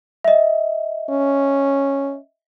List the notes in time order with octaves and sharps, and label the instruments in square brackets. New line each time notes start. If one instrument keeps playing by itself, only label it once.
[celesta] D#5 E5
[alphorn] C#4